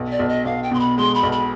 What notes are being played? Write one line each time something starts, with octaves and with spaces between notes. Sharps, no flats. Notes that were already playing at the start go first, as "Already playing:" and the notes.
Already playing: B1
D5
B1
D#5
B1 F5
G5
B2 C6
B5
G#3 C6
B5
B1
B5